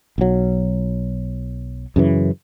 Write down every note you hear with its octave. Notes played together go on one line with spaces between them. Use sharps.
B1 F#3
F#2 C#3 E3